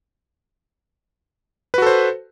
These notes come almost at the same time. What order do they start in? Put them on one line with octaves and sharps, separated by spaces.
B4 F#4 A4 C5